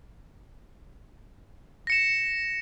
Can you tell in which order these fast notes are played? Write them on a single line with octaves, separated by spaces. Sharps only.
A#6 C#7 E7